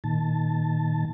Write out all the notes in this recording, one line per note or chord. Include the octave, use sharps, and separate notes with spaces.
A#2 D#3 A5